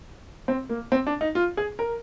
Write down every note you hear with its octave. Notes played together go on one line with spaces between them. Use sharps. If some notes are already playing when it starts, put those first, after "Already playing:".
C4
A#3
C4
D4
D#4
F4
G#4
A#4